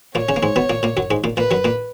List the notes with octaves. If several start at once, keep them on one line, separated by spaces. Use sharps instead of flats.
A#2 A#3 C#5
C#3 C#4
A#3
G#2 G#3
B2 B3
A#2 A#3
A#2 A#3
F#2 F#3
G#2 G#3
A#2 A#3
A#2 A#3 B4
F#2 F#3
A#2 A#3